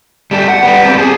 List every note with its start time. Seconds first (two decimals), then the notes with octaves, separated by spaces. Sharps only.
0.31 G3 A4
0.48 F#5
0.63 G3 B3
0.86 C4 A4
0.97 G#4 A4